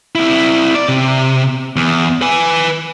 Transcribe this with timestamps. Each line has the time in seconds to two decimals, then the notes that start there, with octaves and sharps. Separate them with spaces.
0.15 C4 E4
0.75 D5
0.89 C3
1.76 E2
2.22 B4 G#5